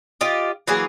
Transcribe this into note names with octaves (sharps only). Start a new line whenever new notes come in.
F4 G4 D#5
E3 F#3 A#3 G#4